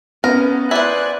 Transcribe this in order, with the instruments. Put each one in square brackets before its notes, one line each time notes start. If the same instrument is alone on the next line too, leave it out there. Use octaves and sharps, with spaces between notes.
[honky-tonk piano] B3 [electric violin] C#4 [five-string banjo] A#4
[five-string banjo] E4 C5 [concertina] D5 G#5 [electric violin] F#6